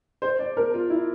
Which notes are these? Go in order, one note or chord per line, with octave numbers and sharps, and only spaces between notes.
C5
D5
A#4
F4
E4